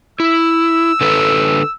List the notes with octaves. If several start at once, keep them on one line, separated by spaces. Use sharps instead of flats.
E4 E6
D3 A4 B4